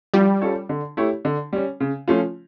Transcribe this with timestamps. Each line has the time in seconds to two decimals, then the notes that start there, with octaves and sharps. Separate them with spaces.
0.14 F3 G3
0.41 C#4 F4 A4 C#5
0.69 D3
0.97 A3 E4 G4 C#5
1.25 D3
1.53 G3 C#4
1.80 C#3
2.08 F3 A3 C#4 F4